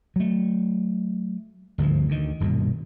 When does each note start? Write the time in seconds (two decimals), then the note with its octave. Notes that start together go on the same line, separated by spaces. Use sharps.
0.16 F#3 A3
1.78 G1 D2 G#2 F3
2.09 D2 D#3
2.40 D#1 G2 B2